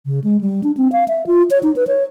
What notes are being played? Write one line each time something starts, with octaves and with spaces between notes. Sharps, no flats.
C#3
G#3
G3
D4
C4
F5
E5
F4
C#5
D#4
B4
C#5